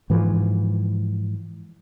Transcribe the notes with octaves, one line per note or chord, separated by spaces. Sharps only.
G#2 E3 F3